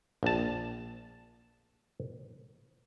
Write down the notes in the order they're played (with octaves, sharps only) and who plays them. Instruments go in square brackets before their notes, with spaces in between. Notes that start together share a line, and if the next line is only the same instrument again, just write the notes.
[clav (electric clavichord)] A#1 A5